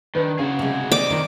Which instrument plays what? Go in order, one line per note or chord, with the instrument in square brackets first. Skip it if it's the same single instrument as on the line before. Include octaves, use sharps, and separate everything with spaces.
[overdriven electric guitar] D#3 [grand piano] D4 B4
[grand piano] C#3 [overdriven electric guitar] F#4 G#4
[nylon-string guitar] C3 G#3
[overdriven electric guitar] C4 D#5 [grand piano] D5 [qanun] D6
[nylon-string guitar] D#3